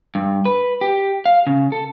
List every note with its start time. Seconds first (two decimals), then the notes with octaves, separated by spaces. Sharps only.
0.15 G2
0.45 B4
0.81 G4
1.26 F5
1.47 C#3
1.72 A4